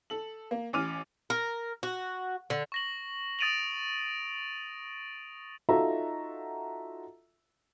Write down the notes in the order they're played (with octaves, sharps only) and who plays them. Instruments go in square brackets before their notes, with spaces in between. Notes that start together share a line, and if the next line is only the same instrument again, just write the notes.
[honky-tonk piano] A4 F#7
A#3
A1 C#4 D6 F6 D#7
[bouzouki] A#4
F#4
D3
[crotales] C#6 A#6 F#7
D#6 A6 D7 D#7 F7 F#7
[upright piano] D#4 F4 F#4 A4 E5 A#5